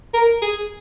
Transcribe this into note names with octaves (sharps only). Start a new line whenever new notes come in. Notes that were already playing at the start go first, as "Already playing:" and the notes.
A#4
G#4